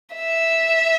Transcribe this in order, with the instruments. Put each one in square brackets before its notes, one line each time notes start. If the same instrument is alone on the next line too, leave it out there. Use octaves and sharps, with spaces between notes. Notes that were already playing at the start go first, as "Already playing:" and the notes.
[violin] E5